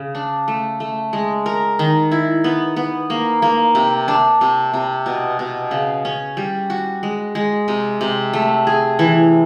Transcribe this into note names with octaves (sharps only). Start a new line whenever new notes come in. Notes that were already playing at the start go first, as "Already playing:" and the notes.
Already playing: C#3
D4
A3
A3
G#3
A#4
D#3
E4
B3
B3
A#3
A#3
C3
D4
C3
C3
B2
B2
C#3
C#4
G3
F#4
G#3
G#3
C3
C3
A3
G#4
E3